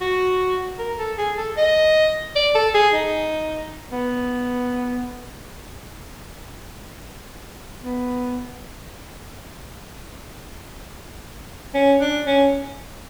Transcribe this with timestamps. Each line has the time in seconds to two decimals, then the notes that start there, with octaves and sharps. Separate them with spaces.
0.01 F#4
0.79 A#4
0.98 A4
1.18 G#4
1.37 A4
1.57 D#5
2.35 D5
2.55 A4
2.74 G#4
2.93 D#4
3.92 B3
7.83 B3
11.74 C#4
12.00 D4
12.26 C#4